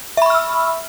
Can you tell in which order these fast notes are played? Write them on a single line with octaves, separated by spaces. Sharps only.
E5 B5 C#6 F6 E6